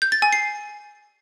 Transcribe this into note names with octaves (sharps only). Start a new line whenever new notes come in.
G6
A6
G#5
C7